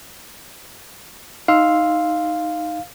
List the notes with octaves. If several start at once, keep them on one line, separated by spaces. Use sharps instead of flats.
D#4 F5 C6 E6